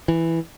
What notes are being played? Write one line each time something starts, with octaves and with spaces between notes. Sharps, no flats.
E3